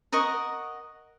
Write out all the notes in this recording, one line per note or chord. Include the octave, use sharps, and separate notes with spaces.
A#4 D#5 F#5 C#6